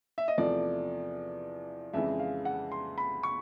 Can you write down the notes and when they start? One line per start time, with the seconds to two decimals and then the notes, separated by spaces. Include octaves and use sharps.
0.18 E5
0.28 D#5
0.38 E2 C3 F3 A3 D5
1.93 F2 C#3 E3 G#3 E5
2.19 F5
2.45 F#5
2.72 C6
2.98 B5
3.23 C#6